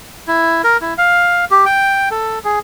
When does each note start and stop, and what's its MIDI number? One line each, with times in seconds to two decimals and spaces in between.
0.27 0.62 64
0.64 0.77 70
0.81 0.94 64
0.98 1.45 77
1.51 1.65 67
1.66 2.09 79
2.11 2.39 69
2.44 2.59 68